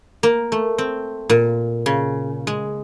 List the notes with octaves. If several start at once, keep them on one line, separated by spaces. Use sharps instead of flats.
A#3
A3
C4
A#2
C#3
G#3